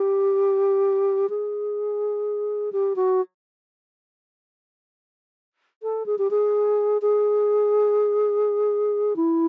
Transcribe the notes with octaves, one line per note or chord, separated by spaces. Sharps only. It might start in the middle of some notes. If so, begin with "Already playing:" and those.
Already playing: G4
G#4
G4
F#4
A4
G#4
G4
G#4
G#4
E4